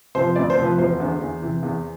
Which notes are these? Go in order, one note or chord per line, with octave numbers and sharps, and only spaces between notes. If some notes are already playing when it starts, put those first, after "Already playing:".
C3 F3 C5
D2 D5
C5
C3 F3
B4
E1 C5
E2 D3
E2
C3 E3
E2